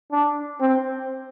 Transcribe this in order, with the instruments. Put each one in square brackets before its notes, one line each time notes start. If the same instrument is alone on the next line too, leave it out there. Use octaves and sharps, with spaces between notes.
[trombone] D4
C4